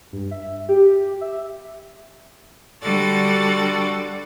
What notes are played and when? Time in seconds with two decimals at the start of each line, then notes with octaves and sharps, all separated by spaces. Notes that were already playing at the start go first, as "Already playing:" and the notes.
0.13 G2
0.31 E5
0.69 G4
1.21 E5
2.82 D3 G3 F#4 A4 D5 A6